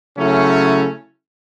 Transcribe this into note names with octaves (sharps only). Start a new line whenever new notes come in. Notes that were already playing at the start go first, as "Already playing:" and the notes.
C#3 F#3 A3 C#4 E4